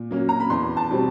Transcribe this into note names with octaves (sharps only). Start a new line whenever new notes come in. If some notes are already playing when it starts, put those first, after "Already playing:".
Already playing: A#2
F#3 A#3 C#4
A#5
B5
E2 C6
A5
B2 G3 C4